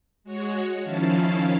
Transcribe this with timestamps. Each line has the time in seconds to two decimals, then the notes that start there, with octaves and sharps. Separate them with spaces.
0.24 G#3 F#4 C#5
0.83 D#3 F3 C#4 E4 F5 A5